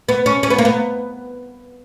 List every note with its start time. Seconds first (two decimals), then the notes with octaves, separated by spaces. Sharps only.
0.09 B3
0.26 C#4
0.43 C#4
0.50 B3
0.58 A#3
0.65 B3